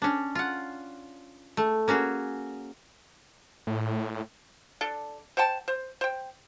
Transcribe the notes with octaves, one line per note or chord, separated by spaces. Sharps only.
C#4 D4
F4 F#5
A3
A#3 C#4 F#4 G#4
A2
D4 A4
C5 F#5 G5 A5
C5
C5 G5